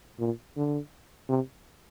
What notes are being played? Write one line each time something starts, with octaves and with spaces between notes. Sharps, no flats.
A#2
D3
C3